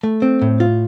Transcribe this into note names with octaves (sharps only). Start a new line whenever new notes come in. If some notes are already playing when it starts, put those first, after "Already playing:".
A3
C4
A2
F4